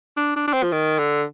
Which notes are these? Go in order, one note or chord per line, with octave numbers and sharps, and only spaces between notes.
D4
D4
D4
C4
F3
D#3
D3